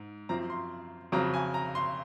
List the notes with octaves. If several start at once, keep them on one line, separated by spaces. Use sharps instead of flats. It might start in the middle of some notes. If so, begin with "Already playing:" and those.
Already playing: G#2
F#2 F3 C4 A#5
C6
F2 C#3 F#3 C4 A#5
G#5
A#5
C6